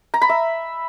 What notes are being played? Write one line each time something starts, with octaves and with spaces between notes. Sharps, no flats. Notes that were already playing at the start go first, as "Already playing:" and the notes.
A#5
B5
E5